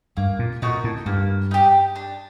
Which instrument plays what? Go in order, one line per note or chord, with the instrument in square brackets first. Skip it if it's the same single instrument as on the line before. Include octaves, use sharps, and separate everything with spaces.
[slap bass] G2 [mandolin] A#3
[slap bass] A#2
[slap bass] A#2 [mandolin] D#4 F#4 A#4
[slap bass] A2
[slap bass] G2 [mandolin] A#3
[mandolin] D#4 G4
D4